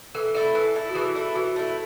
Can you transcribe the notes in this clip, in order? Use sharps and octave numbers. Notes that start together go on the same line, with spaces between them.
E3 A4
A3 E4 A4
E3 A4
A3 E4
F#4
E3 G#4
A3 E4
E3 F#4
A3 E4